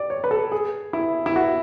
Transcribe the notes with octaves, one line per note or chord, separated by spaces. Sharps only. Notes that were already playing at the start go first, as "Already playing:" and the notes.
Already playing: D5
C#5
B4
A4
G#4
E4
E4
F#4